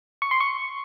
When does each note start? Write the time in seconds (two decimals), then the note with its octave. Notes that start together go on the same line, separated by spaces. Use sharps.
0.22 C#6
0.31 C6
0.40 C#6